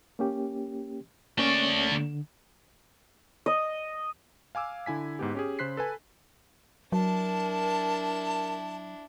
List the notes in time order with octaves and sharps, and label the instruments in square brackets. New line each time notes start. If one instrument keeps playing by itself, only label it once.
[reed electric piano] A#3 C#4 G4
[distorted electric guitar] A3 D5 [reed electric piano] A#3 C#4 C#5
[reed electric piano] D3
[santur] D#5
[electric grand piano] F5 G#5 D6 E6
D3 E4 G#5 B6
G#2 B3 G4
C#4 G4 G#4
C#3 C5 C6 F#6 B6 C7
A4 B4 G#5
[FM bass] F#3 [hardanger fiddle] D4 E4 [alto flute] A#4 [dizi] A5